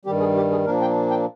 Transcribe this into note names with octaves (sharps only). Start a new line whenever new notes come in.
G2 D#3 G3 G4
G#4
G4
G#4
A#2 F3 A#3 D4 A#4
G5
G5